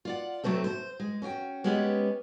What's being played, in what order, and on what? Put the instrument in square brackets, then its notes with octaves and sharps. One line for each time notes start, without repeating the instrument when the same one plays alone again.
[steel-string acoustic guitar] F4 D5 F#5
C3 F#3 A3 C4 A4
C5
G#3
C#4 F#4 C5 G5
G#3 B3 C#4 G4 G#4 D#5